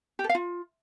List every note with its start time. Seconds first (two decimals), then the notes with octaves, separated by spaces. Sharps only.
0.19 G4
0.24 A4
0.29 F5
0.35 F4